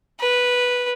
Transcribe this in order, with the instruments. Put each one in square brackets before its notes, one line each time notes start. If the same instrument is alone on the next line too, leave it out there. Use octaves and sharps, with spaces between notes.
[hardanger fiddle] B4